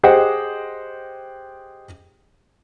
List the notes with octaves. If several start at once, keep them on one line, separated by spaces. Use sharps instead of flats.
G4 G#4 C5 D#5 F#5 G5